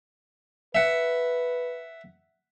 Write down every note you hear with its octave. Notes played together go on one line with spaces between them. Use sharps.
B4 E5 F#5